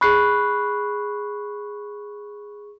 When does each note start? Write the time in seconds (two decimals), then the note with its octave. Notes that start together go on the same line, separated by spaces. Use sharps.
0.01 G#4 B5 C#6 F#6 C7